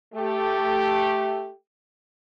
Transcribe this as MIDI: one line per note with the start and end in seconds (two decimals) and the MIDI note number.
0.14 1.52 57
0.14 1.52 67